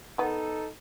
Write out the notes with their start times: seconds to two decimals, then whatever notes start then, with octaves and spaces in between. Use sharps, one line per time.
0.18 D#3 B3 D#4 A4